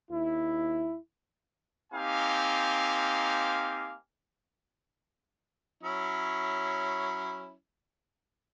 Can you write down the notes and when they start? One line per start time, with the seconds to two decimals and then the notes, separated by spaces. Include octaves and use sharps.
0.11 D#2 E4
1.93 A#3 C4 D#4 G4 F5 G#5
5.83 F#3 C#4 E4